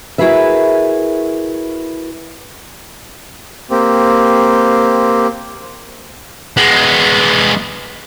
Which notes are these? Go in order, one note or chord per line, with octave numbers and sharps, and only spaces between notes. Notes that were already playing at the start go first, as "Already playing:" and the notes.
E4 F#4 G#4 A#4 B4 E5
A#3 C4 G4
G#3 B3